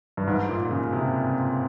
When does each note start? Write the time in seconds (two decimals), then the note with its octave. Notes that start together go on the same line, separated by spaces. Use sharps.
0.17 G2
0.27 G#2
0.49 A#2
0.71 C#3
0.93 C3